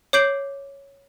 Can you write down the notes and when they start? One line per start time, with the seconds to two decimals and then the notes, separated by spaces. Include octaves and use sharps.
0.13 C#5 D6 G6 C7 D7 F#7